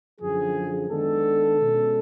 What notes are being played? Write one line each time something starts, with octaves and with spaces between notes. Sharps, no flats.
F#2 D3 F3 G#4
D#3 G#3 B3 D4 A4
B2 G#3 C#4